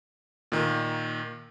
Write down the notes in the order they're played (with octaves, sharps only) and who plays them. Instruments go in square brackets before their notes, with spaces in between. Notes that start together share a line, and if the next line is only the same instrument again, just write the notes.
[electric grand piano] A#2 D#3 A#3 A#4